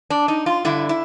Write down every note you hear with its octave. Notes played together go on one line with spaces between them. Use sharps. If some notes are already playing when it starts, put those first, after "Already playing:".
D4
D#4
F4
G2 D3 E4
E4